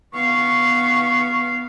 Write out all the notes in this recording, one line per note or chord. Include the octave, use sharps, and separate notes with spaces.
B3 F5 C#6